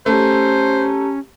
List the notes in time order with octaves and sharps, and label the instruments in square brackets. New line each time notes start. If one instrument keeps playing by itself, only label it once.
[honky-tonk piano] A3 [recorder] C#4 [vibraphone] G4 A5 A#5 [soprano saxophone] C5